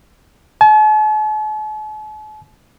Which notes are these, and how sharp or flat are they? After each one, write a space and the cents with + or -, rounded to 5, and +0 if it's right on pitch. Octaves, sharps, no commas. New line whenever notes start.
A5 -45